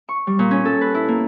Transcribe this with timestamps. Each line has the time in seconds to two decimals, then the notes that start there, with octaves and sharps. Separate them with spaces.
0.09 C#6
0.27 G3
0.39 A#2
0.51 C#4
0.65 A4
0.81 B4
0.94 E4
1.08 A#3